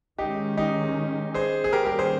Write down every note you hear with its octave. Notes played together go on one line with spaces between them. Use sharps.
D#3 G#3 C#4 D#4 G4
D#4 G4
G#4 C5
G#4
D#3 G3 A#3 C#4 G4 A#4
G4 A#4
G#4 C5